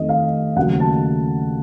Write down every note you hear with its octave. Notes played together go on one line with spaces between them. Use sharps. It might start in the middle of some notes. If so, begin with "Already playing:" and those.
Already playing: F2 D#3 A3 D#5
F5
D#2 C#3 F#3 A3 F#5
A5